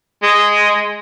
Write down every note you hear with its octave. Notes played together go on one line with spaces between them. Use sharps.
G#3